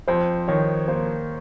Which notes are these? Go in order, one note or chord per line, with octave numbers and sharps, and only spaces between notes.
F2 C5
D#3 C#5
A#3 C5